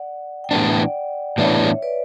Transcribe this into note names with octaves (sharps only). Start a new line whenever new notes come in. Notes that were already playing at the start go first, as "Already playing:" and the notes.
Already playing: D5 F#5
G5
A2 E3 B3 D4 D5 F#5
A2 E3 B3 D4 C#5 E5
B4 D5